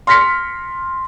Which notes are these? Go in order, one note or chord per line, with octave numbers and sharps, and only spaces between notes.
C6 F6 A#6 B6 C#7